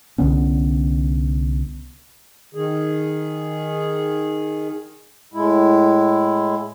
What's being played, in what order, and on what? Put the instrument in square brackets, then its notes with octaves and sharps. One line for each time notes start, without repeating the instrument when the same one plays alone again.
[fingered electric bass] C2 D3 B3 C#4
[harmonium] D#3 G#4
A2 G#3 E4